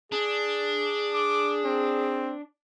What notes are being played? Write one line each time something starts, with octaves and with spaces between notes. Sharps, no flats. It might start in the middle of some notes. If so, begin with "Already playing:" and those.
D4 G#4
D6
C4